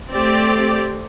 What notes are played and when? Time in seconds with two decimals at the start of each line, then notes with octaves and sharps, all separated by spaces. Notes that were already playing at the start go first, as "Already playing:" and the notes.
0.12 A3 C4 G4 D5